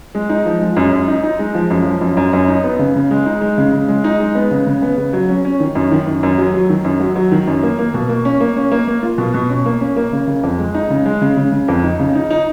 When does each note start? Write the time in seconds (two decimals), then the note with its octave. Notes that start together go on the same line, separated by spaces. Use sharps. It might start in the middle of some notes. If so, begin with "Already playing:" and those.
0.15 G#3
0.29 D#4
0.46 F3
0.61 G#3
0.77 F#2
0.92 F#2
1.08 D#4
1.23 D#4
1.39 G#3
1.54 F3
1.70 F#2
1.86 F3
2.01 F#2
2.17 F#2
2.33 F#2
2.48 D#4
2.64 B3
2.79 C#3
2.96 C#3
3.11 G#3
3.26 D#4
3.41 G#3
3.58 C#3
3.73 C#3
3.88 G#3
4.04 D#4
4.20 G#3
4.35 B3
4.51 C#3
4.67 C#3
4.82 B3
4.97 C#3
5.13 F#3
5.29 C#4
5.45 C#4
5.60 D#3
5.75 F#2
5.91 D#3
6.07 F#2
6.23 F#2
6.38 F#3
6.54 F#3
6.69 D#3
6.84 F#2
7.00 F#3
7.15 F#3
7.32 D#3
7.47 F#2
7.63 A#3
7.79 A#3
7.94 B2
8.09 A#3
8.25 C#4
8.40 A#3
8.57 C#4
8.71 A#3
8.88 A#3
9.03 F4
9.18 B2
9.34 B2
9.50 C#4
9.66 A#3
9.81 C#4
9.96 A#3
10.12 C#3
10.27 C#3
10.43 F2
10.59 G#3
10.75 D#4
10.90 C#3
11.06 G#3
11.21 C#3
11.37 C#3
11.52 C#3
11.68 F2
11.84 D#4
11.99 C#3
12.15 D#4
12.30 D#4